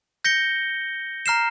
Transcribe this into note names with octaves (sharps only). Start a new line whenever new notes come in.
G6 A#6 C#7 G7
A#5 F6 C7 E7